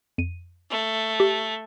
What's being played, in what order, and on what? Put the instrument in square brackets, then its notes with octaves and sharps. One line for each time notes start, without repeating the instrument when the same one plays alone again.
[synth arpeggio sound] F2 D#7
[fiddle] A3
[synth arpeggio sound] G4